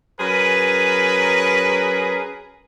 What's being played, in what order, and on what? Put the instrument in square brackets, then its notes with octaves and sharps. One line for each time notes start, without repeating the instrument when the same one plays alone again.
[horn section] F#3 C#4 G#4 A#4 B4